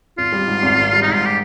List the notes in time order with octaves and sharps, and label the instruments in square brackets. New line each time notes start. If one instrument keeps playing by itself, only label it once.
[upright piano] G#1 [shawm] F4
[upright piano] G3
G#2
G#1
G#1
G3
[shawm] D#4
[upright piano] G#2
[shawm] F4
G4